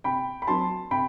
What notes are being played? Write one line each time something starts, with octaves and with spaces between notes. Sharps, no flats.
C3 G5 B5
B5
F#3 C4 A5 C6
C3 G5 B5